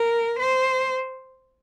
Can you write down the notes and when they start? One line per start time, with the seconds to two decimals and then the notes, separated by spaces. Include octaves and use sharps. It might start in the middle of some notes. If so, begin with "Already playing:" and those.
Already playing: A#4
0.39 C5